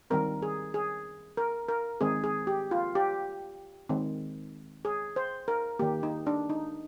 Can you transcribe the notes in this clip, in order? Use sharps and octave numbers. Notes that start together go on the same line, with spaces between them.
D#3 G3 C4 A#4
G#4
G#4
A#4
A#4
D#3 G#3 C4 G#4
G#4
G4
F4
G4
D#3 G#3 C4
G#4
C5
A#4
D#3 A#3 G4
D#4
D4
D#4